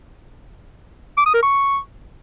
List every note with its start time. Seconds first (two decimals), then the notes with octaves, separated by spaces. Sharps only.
1.17 D6
1.26 D#6
1.34 A#4
1.42 C#6